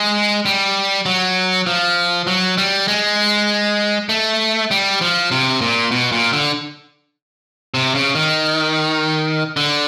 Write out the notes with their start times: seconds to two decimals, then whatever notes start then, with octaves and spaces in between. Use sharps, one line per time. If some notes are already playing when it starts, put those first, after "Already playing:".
Already playing: G#3
0.45 G3
1.06 F#3
1.67 F3
2.27 F#3
2.58 G3
2.88 G#3
4.09 A3
4.71 G3
5.01 F3
5.31 C3
5.61 A#2
5.91 B2
6.12 A#2
6.32 D3
7.74 C3
7.95 C#3
8.15 D#3
9.57 D3